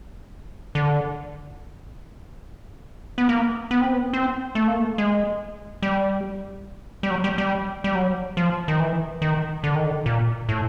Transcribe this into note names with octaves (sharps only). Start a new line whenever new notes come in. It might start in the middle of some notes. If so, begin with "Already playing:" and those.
D3
B3
A#3
B3
C4
B3
C4
A3
A#3
A3
G#3
G3
G3
F#3
G3
G3
G3
F#3
F3
D#3
E3
D#3
D3
D#3
D3
A#2
A2